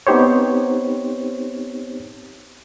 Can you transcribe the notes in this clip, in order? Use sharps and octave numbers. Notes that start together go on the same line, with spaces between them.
B3 C4 D#4 G4 C5 C#5